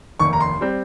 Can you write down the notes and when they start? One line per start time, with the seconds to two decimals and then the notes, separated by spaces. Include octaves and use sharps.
0.20 F1 D#2 D#3 C#6
0.33 A#5
0.40 C6
0.61 G3 C4